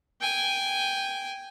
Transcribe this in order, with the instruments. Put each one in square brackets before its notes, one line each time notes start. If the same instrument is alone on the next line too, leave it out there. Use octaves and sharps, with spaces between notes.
[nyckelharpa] G5 G#5